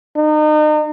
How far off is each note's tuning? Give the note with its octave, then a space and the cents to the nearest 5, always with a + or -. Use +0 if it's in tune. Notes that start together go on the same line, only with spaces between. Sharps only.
D#4 -35